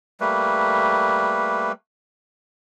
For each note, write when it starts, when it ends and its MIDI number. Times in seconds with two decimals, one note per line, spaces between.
0.20 1.72 55
0.20 1.72 57
0.20 1.72 58
0.20 1.72 71